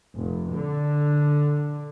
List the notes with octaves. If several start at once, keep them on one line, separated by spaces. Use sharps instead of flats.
F1
D3